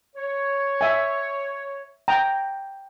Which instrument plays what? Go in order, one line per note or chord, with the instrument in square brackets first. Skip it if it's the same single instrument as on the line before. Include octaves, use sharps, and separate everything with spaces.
[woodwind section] C#5
[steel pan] E5 G#5
G5 A#5